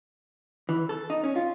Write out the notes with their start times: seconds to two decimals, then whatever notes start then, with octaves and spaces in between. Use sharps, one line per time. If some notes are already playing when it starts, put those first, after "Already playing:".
0.69 E3
0.89 A4
1.10 D#4
1.24 C#4
1.36 F4